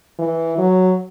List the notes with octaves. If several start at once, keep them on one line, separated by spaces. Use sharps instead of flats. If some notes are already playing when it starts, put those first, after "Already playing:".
E3
F#3